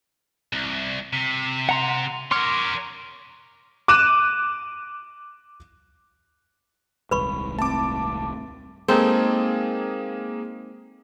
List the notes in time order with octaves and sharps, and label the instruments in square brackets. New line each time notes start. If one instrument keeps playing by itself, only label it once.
[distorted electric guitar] C2
C3
[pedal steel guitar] F#5 A#5 C6
[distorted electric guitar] A#4 C#5 [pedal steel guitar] C6 D6 F6
[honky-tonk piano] D6 F#6 D#7 E7
[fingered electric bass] D#1 C2 G#2 [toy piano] B4 B5 C#6
[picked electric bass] A3 C4 [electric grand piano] A5 D6
[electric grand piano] G#3 A#3 G#4 [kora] C4 D#4 A4